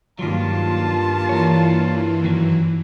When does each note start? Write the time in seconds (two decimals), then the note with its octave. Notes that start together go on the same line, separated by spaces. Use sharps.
0.19 G2 D#3 F#3 A#3 F4 A5
1.29 E3 A#4 C#5
2.24 F#2 D#3 F#3